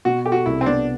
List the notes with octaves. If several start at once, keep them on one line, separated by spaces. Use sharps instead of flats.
B2 F#4
G4 A4
F#4
C2 E4
C4
B3 D4